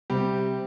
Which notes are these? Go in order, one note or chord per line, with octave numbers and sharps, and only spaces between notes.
C3 G3 C4 G4